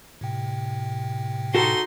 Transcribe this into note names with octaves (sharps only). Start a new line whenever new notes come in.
A2 C3 G5
D#4 F#4 A4 C6